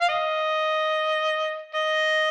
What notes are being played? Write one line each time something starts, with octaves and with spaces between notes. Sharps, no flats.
F5
D#5
D#5